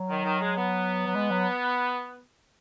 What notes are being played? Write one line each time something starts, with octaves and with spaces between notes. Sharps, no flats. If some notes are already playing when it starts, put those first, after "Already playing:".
Already playing: F#3
D#3
D#3
G#3
B3
F#3
G#3
F#3